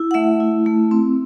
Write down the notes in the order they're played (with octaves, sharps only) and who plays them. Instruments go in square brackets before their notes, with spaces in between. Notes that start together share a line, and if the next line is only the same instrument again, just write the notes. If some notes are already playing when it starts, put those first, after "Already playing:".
Already playing: [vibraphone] E4
F#5
A3 E5
E4
A3
C4